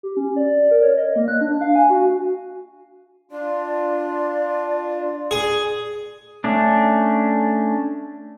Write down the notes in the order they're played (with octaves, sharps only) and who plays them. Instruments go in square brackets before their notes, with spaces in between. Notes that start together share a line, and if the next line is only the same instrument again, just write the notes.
[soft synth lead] G4
C#4
D5
A#4
C#5
D#5
A#3
F#6
D4
F5
G#5
F#4
[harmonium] D4 F4 [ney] D5
[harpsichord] G#4
[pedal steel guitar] A3 C#4 D4